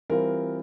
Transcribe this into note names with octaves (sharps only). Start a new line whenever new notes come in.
E3 G3 C4 F4 A#4